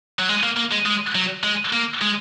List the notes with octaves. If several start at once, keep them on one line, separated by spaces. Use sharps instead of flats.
F#3
G#3
A#3
A#3
G#3
G#3
F#3
G#3
A#3
G#3